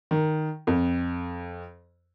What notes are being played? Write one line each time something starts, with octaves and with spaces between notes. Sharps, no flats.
D#3
F2